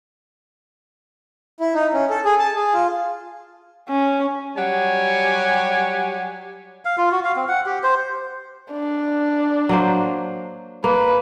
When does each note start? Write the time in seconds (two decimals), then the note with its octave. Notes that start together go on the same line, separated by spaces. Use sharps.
1.60 E4
1.74 D#4
1.93 C#4
2.10 A4
2.25 G#4
2.39 A5
2.55 G#4
2.74 F4
3.89 C#4
4.57 F#3 G3 G4 F#5 G#5
6.85 F5
6.98 F4
7.11 F#4
7.24 F5
7.36 C4
7.48 F#5
7.66 G4
7.83 C5
8.72 D4
9.69 F#3 A#3 C5
10.84 A#3 B4